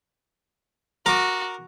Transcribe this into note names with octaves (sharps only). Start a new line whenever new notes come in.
F#4 A#4 D6